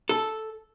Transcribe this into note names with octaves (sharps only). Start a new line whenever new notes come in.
A4